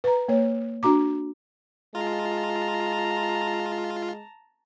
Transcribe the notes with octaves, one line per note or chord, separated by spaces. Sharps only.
B4 A#5
A#3 C#5
D4 F#4 A#5 D6
G#3 F4 A5 A#5